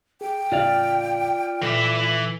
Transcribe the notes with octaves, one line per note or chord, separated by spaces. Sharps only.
G#4 G5
E2 A2 C#3 F4 D5 F5
A#2 E3 A4 E5 D6